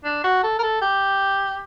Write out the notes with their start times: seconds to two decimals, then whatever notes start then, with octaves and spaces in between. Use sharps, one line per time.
0.04 D4
0.24 F#4
0.43 A4
0.59 A#4
0.63 A4
0.81 G4